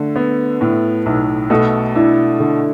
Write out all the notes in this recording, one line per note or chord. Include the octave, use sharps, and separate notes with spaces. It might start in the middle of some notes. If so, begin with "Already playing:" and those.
Already playing: D3 A3 A4
B3
A2
B1
B2 A3 A4
D4 E4
D3